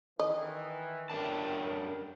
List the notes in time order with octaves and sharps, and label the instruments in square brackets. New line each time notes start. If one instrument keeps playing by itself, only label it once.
[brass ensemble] D#3 E3 [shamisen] D#5
[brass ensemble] G1 A3 G5 [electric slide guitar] F#2 D4 A5 [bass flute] A#4